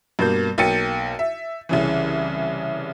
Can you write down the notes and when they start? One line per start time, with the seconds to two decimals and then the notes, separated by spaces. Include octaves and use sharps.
0.19 G2 B2 A#3 G6
0.58 B1 A#3 G5 A6 C#7 D#7
1.19 E5
1.69 C2 C#3 E3